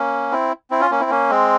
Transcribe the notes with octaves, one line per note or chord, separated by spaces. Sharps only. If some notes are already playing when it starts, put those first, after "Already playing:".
Already playing: A#3 C#4
C4 E4
C4 E4
C#4 F4
A#3 C#4
C4 E4
A#3 C#4
G#3 C4